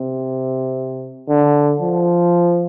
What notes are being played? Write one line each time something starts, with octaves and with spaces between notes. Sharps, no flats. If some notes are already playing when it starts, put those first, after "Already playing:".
Already playing: C3
D3
F3